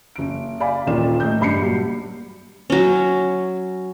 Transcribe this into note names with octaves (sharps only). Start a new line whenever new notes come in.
F#1 D7
D5 F5 G#5 B5
D#1 D#3 A#3 F4 D5 E7
A2 D#5 G6
F#1 G2 B5 C7 C#7
A#2 F#3 G3
F#3 C#4